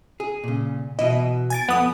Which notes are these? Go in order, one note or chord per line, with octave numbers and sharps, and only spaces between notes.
G#4
A#2 C#3
B2 E3 E4 D#5
G#5 A6 D7
F2 B3 D#6